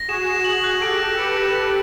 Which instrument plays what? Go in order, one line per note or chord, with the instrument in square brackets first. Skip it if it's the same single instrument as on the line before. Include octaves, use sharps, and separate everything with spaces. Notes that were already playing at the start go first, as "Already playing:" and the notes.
Already playing: [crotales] A#6
[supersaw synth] F#4 G#4 [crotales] E7
[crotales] E7
F#7
F#6
[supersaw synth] G4 A4 [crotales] D7
[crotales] A#6
[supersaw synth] A4 B4 [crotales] C#7
[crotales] E7
A#6